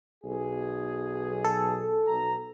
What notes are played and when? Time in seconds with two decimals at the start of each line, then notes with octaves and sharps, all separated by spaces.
0.23 B1 G#4
1.44 A4
2.08 B1 A#5